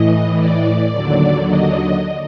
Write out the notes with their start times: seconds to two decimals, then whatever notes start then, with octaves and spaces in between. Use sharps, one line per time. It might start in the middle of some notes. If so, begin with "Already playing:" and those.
Already playing: A2 E3 D#5
0.36 D5
0.92 D#2 D3 F#3
1.47 D#5